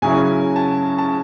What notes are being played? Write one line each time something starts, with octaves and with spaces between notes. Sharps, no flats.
C#3 F#3 C#4 E4 G#5
A5
A5